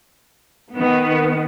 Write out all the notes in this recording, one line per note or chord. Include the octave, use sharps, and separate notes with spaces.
D#3 B3